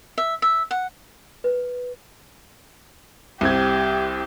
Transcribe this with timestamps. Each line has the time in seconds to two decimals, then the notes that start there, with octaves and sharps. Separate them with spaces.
0.18 E5
0.42 E5
0.71 F#5
1.44 B4
3.41 C2 C4 G4 G#6